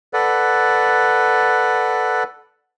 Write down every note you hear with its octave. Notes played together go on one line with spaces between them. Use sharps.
A4 B4 D5 F#5